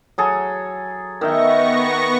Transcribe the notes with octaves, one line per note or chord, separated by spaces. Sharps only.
F#3 G#4 A4
D#3 B3 E5 G5 C#6 A#6